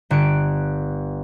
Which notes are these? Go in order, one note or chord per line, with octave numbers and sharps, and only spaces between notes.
G1 F#6 C#7 D7